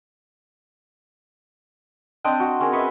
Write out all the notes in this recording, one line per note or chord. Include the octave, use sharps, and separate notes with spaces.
C4 D4 D#5 G5
F#4
C4 C#4 G#4 A#4
B4 C#5 D#5 E5